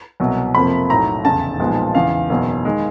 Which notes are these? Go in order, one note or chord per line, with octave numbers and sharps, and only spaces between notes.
C2 B2 F#3
F2 C3 F3 A#3 B5
B1 A2 F#3 A#5
F1 E2 C#3 A5
B1 A#2 F3 G#3 B3
E2 C#3 E3 F5
F#1 E2 B2 F#3
D#3 G#3